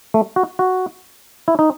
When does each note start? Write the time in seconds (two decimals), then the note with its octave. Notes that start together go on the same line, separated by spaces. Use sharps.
0.14 A3
0.36 F#4
0.59 F#4
1.48 E4
1.59 D#4